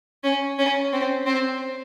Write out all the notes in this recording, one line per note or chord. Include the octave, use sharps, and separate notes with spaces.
C#4
C#4
C4
C4